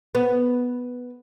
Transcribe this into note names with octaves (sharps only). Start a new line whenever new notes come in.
B3